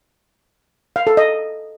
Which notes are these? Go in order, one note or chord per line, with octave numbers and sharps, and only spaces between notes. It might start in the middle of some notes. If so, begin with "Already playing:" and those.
F5
A4
D#5